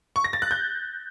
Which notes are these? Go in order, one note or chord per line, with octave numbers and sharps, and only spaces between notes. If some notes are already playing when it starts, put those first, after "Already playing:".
C#6
A#6
A6
F#6
G6